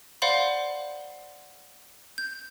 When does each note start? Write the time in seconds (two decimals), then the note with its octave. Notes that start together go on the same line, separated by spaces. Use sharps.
0.22 C5 D5 F5 F#5 B5 C6
2.18 G6